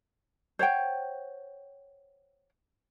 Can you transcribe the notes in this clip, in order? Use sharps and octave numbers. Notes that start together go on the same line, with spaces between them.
C5 C#5 F#5 G5